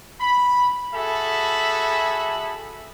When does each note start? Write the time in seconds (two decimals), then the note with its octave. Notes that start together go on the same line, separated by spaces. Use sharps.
0.20 B5
0.94 F#4 G#4 A4 E5 B5